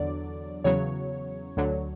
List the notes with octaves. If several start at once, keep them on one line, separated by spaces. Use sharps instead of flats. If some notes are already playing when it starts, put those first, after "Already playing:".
Already playing: E2 D3 F#3 D5
E2 C#3 F#3 C#5
D2 D3 F#3